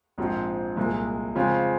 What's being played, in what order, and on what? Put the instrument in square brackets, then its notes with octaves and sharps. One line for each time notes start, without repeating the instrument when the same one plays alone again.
[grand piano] A#1 G#2 F3 C4
C2 A#2 G#3
C#3 F3 G#3 C4 F4